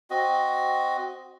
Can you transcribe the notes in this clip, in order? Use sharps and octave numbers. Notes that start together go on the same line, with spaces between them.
C4 F#4 D#5